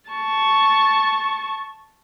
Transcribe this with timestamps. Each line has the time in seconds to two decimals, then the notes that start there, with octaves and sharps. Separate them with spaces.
0.10 A5 C#6